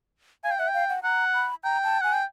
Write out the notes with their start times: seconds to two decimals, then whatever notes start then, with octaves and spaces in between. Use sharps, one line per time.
0.44 F5 G#5
0.51 G5
0.58 E5 F#5
0.68 G5
0.74 F5
0.89 F#5
1.03 F#5 A#5
1.34 B5
1.64 G5 A#5
1.84 A5
2.01 F#5 G#5
2.13 G5